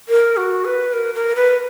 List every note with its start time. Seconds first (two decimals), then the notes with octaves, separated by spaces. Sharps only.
0.09 A#4
0.37 F#4
0.65 B4
0.93 A#4
1.14 A#4
1.36 B4